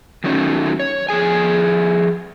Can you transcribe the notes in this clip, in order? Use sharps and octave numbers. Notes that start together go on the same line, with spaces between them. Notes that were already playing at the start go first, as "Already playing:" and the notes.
D#3 F#3 A3 C#4 D#4
C#5
F2 C3 G#4 G#5